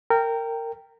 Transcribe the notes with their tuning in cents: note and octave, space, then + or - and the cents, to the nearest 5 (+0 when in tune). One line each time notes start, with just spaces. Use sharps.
A#4 -20 G5 +0